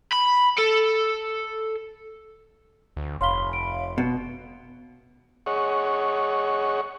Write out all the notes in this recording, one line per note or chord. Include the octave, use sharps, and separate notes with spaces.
B5
A4
D2
F1 C#5 F5 B5 C6 G7
D7
B2
G#4 C#5 D#5 F#5 C#6